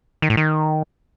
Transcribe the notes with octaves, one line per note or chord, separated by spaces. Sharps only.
D#3
A2
D#3